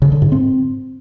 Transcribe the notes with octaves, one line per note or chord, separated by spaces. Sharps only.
C#3
D3
G#2
C4